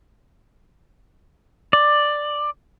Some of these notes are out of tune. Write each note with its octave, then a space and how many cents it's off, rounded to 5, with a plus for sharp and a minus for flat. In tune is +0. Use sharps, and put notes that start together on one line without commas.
D5 +10